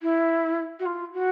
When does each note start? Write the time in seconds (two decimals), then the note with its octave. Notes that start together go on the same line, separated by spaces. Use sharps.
0.02 E4
0.79 F#4
0.85 F4
1.13 F#4